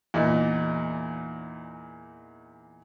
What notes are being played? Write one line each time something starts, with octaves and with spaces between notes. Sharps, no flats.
E2 A#2 D#4